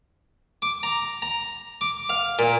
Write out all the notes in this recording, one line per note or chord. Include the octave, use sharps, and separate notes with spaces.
D6
A#5
A#5
D6
F5
A#2